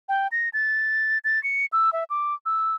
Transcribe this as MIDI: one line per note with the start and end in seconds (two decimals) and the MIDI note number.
0.09 0.28 79
0.32 0.49 94
0.53 1.18 93
1.24 1.42 93
1.44 1.66 97
1.73 1.93 88
1.93 2.04 76
2.10 2.34 86
2.46 2.76 88